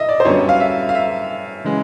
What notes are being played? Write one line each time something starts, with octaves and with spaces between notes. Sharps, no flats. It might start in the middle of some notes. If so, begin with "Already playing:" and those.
Already playing: D#5 E5
D5
C5
F#2 D3 G3 B3 C#5
F5
E5
F5
E5
C#3 E3 G#3